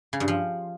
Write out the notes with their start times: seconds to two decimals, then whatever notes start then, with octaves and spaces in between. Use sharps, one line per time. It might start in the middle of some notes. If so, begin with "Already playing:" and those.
0.13 C#3
0.20 G2
0.28 F3